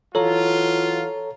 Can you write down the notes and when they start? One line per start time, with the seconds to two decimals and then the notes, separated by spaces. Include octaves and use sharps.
0.15 E3 F#3 F4 A4 C#5 A#5